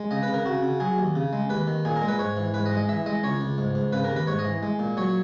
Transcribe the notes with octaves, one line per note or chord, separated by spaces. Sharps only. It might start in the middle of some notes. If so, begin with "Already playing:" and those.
Already playing: G#3
C#3 D#5
B4
C#3
A#4
C#3 F#4
C#3
F#3 G#4
D#2
C#3
G#3
D#2 B4
D#3
A#2 G#4
A#4
G#3
B4
G#2 C#5
E3
G#2 B4
D#5
G#3
D#5
E3 E5
G#3 D#5
C#2 C#5
C#2
G#2
G#2
C#3 B4
A#4
D#2
B4
G#2 C#5
D#5
E3
G#3
A#2
F#3 C#5